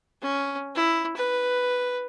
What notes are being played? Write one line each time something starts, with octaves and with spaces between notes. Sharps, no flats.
C#4
E4
B4